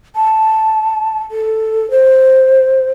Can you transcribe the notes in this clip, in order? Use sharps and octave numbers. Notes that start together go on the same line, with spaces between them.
A5
A4
C5